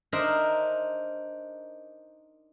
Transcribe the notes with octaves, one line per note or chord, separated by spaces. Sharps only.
D4 D#4 A#4 C5 E5